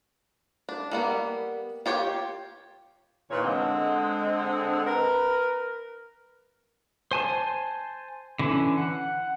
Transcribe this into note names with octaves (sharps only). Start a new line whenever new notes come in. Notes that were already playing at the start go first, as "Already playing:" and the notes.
D4
G3 A#3 B3
F4 G4 C#5 G5
E2 A#2 D#3 A#3 B4 C#5
D3 G#3 C4
A#4 B4
C5 G#5 A5
D3 E3 C#4
F#5